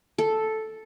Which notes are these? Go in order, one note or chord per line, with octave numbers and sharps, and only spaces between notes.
A4